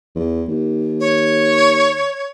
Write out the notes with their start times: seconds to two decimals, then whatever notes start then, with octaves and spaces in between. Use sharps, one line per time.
0.15 E2
0.48 D#2
1.00 C#5